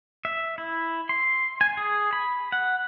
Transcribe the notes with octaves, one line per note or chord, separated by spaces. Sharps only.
E5
E4
C6
G#5
G#4
B5
F#5